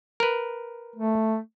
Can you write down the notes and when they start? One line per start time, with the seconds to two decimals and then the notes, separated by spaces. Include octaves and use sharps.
0.20 A#4 B4
0.96 A3